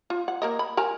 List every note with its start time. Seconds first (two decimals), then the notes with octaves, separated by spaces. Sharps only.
0.10 F4
0.28 F#5
0.42 A#3 A#4 D#5
0.59 B5
0.77 A#4 G#5 A#5